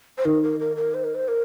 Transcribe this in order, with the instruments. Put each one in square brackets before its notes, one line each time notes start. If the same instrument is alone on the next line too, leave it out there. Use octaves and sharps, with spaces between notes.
[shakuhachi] C5
[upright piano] D#3 [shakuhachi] A#4
[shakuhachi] A#4
A#4
A#4
C5
A#4
C5
A#4